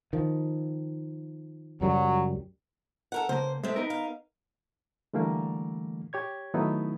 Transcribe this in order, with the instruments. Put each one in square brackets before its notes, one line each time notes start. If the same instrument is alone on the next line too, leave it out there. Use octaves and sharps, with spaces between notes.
[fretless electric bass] D#3 F3
[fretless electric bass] C#2 F#2 G3 [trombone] F#3
[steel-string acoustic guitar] A4 A#4 F#5
[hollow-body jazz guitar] C#2 A#3 [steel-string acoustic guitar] C5
[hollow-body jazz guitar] G#3 A3 [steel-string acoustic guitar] C4 E5
[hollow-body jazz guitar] B3 D#4 A#4
[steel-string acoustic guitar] F5
[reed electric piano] D3 E3 G3 A3 A#3
G4 C#5 G#6
D#3 F#3 A3 B3 D#4 E4